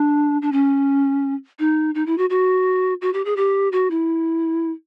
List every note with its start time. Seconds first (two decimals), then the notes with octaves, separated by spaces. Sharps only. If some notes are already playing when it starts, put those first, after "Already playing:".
Already playing: D4
0.42 D4
0.52 C#4
1.59 D#4
1.95 D#4
2.06 E4
2.18 F#4
2.30 F#4
3.01 F#4
3.13 G4
3.25 G#4
3.37 G4
3.72 F#4
3.91 E4